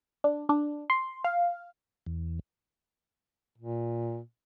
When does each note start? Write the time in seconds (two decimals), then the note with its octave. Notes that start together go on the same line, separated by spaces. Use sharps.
0.24 D4
0.49 D4
0.90 C6
1.24 F5
2.06 E2
3.58 A#2